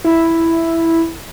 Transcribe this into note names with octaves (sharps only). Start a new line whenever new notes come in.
E4